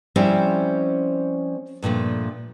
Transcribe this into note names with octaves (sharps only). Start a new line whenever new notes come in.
F3 G3 C4 C#4 E4
G2 A#2 F3 A3